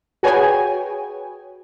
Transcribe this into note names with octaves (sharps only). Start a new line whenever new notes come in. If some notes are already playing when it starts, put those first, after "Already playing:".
F#4 G#4 B4 C#5 G5 G#5